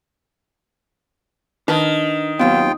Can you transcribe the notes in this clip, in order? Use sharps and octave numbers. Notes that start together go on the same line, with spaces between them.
D#3 D4 B4 A5
D#2 F#3 B3 C4 F4 G5